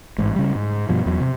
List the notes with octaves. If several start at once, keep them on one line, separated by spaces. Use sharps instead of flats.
A1 G#2
C#3 G3
G#2
G2 B2 F3
E2 F#3
C3